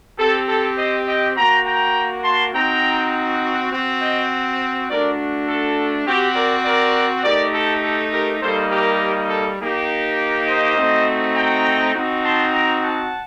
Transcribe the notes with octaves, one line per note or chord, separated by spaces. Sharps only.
C4 G4 A4
A4
C5 D#5
D#5 G5
A#3 F#4 G5 A#5
G5 A#5
A5 C6
C4 D#4 F#4 G5 A#5
C4 F#4
D#5 G5
A3 D4 F#4 A#4 D5
A4
C4 F#4 G4
A#4 D5
A#4 D5
A3 D#4 G4 A#4 D5
A4
A4
G4 A#4
G3 A#3 D#4 A4 C5
G4 A#4
A4
A#3 D#4 G4
C5 D#5
A3 C4 D#4 F#4
G5 A#5
C4 D#4 F#4
A5 C6
G5 A#5
F#5 A5